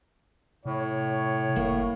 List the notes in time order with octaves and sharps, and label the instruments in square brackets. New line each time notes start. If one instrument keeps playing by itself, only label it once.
[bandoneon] A2 [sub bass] C3 [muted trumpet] C#5
[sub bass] G1 [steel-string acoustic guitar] A#3